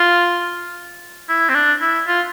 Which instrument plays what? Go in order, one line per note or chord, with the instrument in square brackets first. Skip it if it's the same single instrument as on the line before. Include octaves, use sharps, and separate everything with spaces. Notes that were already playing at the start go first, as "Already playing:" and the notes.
Already playing: [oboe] F4
E4
C4
D4
E4
F4